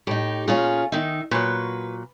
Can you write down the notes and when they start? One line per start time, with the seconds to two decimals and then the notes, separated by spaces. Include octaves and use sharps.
0.07 A2 D#4 G4
0.48 A#2 C#4 F4 G#4
0.92 D#3 D#4 E5
1.31 A#2 F#3 B4